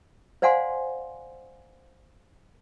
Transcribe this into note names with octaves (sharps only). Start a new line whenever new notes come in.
C5 D5 F5 F#5 G#5 C6